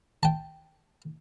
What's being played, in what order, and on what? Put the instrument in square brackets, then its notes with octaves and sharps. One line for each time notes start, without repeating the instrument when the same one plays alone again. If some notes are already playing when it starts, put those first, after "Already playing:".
[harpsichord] G5 A5